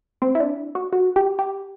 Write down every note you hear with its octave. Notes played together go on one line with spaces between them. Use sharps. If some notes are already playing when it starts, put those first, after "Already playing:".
C4
E4
D4
F#4
F#4
G4
G4